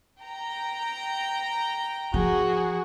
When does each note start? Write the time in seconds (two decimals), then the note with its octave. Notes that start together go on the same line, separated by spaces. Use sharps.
0.21 G5 A#5
2.14 F3 F#4 G#4